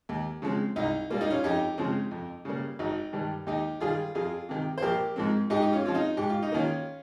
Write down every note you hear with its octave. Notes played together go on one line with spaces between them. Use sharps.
D#2
C#3 F3 G#3 C4
C2 D#4
A#2 G3 A#3 F4
D#4
C#4 F4
F2 D#4 G4
C#3 F3 G#3 C4
F2
C#3 G3 A#3
G#1 D#4
G2 D#3 G3
D#2 D#4 G4
D#3 G3 F4 G#4
F2 F4 G#4
C3 D#3
C5
A#1 G4 A#4
G#2 F3 G#3 C4
G#2 D#4 G4
D#4
C#4 F4
F3 C4 F4
D#4
G#2 G4
F4
D#4
D#3 A#3 C#4 F4